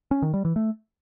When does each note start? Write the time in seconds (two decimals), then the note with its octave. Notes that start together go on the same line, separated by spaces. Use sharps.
0.11 C#4
0.22 D#3
0.34 G3
0.45 E3
0.56 A3